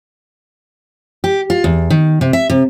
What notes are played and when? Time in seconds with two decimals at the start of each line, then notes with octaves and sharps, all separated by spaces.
1.24 G4
1.50 F4
1.64 E2
1.90 D#3
2.21 C3
2.33 E5
2.50 C3